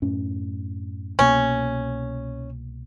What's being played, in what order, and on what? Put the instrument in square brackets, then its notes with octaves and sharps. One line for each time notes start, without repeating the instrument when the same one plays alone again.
[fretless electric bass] F#2 A2 C#4
[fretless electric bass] C2 B2 A#3 [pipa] C#4